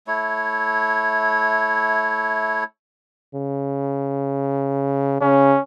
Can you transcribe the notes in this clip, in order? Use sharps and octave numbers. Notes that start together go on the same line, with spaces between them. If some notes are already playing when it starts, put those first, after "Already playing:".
A3 E4 C#5
C#3
C#3 C#4